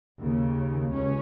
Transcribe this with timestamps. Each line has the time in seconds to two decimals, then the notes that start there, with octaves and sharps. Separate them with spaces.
0.19 D#2 C#3
0.92 C#2 C#4